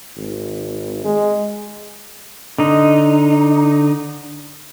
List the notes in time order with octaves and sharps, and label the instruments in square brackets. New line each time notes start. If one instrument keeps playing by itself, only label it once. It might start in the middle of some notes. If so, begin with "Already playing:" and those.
[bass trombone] G#1
G#3
[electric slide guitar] D3 D#4